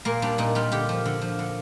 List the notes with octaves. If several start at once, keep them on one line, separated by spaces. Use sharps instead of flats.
A#2 A#3
G3 D4
A#2 D#4
G3 F4
D3 G4
F3
D3
F3
D3